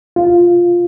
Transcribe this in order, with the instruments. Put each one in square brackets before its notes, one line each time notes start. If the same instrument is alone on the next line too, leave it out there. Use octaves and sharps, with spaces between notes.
[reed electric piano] F4